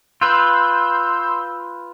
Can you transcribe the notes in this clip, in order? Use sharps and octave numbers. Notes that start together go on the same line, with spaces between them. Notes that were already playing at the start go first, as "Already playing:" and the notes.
F4 B4 C6 E6 G6